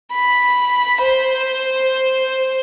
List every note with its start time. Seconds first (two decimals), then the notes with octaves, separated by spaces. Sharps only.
0.13 B5
1.03 C5